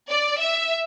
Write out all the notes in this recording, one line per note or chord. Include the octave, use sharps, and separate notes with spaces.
D5
E5